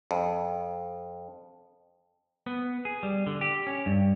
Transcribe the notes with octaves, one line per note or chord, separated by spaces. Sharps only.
F2
B3
G#4
G3
D3
G4
C#4
G2